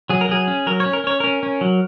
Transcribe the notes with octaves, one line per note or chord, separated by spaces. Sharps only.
F#3 G#4
A#4
F#3 G#4
C#4
F#3 A#4
C#5
C#4
A#4
C#4 C#5
C#4 A#4
C#4
F#3